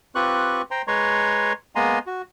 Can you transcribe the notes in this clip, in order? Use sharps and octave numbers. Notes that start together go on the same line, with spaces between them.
C4 F4 G4 B4 C#6 F#6
C5 G5 A#5 C6
G#3 B4 C#5 A#5 C6 C#6
G#3 A#3 B3 G#5 A#5 C6
F#4